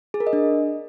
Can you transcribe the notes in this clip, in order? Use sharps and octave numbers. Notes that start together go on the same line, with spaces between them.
G#4
A#4
D#5
D4